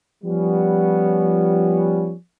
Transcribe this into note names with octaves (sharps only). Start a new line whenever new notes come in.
F3 G3 B3 C#4